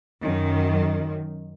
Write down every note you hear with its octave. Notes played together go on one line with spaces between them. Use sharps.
F#2 D#3